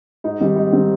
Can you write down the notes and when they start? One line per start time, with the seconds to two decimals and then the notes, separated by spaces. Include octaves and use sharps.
0.24 G#2 D#4
0.40 D#3 G3 C4
0.56 G#2 D#4
0.72 D#3 G3 C4